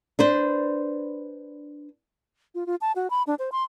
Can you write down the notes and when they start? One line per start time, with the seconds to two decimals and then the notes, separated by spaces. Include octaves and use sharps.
0.19 D4 B4 C5
2.55 F4
2.66 F4
2.81 A5
2.96 F#4
3.10 B5
3.27 D4
3.39 C5
3.52 C6